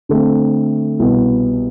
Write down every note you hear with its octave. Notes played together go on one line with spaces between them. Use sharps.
D3 A3 C4
C2 B2 B3